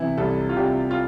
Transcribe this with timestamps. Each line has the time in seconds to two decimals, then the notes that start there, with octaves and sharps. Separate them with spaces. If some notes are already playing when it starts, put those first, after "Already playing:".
Already playing: C3 E3 E4
0.18 C2 A4
0.49 F4
0.56 C2 G4
0.91 F4